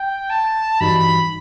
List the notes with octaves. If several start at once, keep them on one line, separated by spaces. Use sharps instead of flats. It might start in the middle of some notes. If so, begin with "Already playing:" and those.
Already playing: G5
A5
G2 E3 G3 D#4 F#4 B5